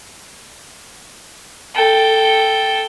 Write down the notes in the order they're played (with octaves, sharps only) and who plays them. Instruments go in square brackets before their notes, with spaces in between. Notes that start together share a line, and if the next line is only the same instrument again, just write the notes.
[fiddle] A4 G5